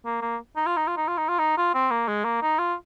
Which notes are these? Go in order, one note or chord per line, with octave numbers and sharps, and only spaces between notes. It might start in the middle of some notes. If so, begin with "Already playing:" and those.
A#3
A#3
D#4
F4
D#4
F4
D#4
F4
D#4
F4
D#4
F4
C4
A#3
G#3
A#3
D#4
F4